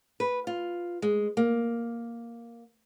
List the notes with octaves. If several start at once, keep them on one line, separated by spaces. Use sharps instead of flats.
B4
F4
G#3
A#3